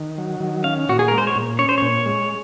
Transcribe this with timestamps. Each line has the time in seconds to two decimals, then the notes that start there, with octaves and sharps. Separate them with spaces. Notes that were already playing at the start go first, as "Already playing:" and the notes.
Already playing: D#3
0.18 F#3
0.40 D#3
0.64 C#4 F5
0.89 A#2 F#4
0.99 G#4
1.08 G#3 A#4
1.18 C5
1.27 C#5
1.36 A#2
1.59 C#4 C#5
1.69 C5
1.78 A#2 C#5
2.06 G#3